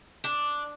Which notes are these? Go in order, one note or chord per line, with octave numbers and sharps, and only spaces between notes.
D4